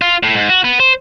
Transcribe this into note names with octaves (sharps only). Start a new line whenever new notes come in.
F4
A2
G#2
F#4
B3
C5